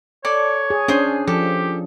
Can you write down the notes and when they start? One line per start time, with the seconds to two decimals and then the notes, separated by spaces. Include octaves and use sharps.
0.25 A4 C#5 D5 A5
0.70 G#4
0.88 C#4 D4 G#4 C5 D#6
1.28 F3 G4 A4